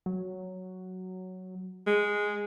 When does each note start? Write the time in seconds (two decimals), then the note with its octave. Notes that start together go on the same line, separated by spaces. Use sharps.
0.06 F#3
1.87 G#3